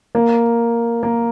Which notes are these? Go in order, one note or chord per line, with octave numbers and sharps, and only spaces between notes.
A#3
A#3